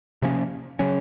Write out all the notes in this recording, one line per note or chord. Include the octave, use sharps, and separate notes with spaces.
C3 F3 A#3 C#4
C#3 F#3 C#4